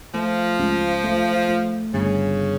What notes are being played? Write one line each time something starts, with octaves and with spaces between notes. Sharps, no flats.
F3 A3
C#2
A3
A3
G1 C#3